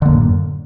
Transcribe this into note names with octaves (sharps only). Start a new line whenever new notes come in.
F#2 A2 D3 A#3